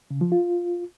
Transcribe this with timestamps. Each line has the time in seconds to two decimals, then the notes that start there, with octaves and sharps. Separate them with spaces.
0.11 C#3
0.21 F3
0.32 F4